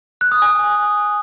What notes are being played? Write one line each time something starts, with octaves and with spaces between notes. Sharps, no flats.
F#6
D#6
G#5